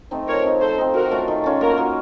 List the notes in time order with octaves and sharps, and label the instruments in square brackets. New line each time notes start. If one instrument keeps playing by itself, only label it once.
[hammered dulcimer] A3 C4 D#4
[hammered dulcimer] F3 [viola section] A#4 C#5
[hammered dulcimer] C4 D#4
[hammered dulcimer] F3 [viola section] A4 C5
[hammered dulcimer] C4 D#4
[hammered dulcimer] D#3 [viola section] F#4 A#4
[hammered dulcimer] A3 C#4 F4
D#3
A3 C#4 F4
[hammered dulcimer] A#3 [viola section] F#4 A#4
[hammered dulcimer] D#4 F#4